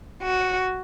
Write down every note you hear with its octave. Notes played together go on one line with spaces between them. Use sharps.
F#4